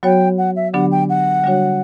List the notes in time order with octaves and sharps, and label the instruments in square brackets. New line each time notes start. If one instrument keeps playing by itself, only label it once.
[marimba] F#3 B3 F#4 C#5 [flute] G5
[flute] F#5
E5
[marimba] D3 F#3 B3 D4 G4 [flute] F#5
[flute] G5
F#5
[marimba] D3 G3 D4 F#4 C#5